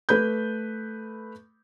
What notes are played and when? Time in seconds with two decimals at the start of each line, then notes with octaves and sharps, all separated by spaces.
0.09 A3 B4 B5 G6